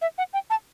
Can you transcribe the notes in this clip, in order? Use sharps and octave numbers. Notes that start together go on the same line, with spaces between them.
E5
F#5
G5
A5